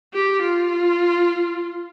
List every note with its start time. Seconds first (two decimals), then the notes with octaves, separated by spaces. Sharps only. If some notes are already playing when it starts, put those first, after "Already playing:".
0.13 G4
0.42 F4